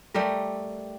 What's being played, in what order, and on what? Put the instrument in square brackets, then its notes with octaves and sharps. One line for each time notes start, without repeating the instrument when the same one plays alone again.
[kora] G3 A3 G4 A#4